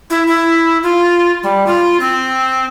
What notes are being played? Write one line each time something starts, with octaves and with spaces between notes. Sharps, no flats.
E4
E4
F4
G3
F4
C4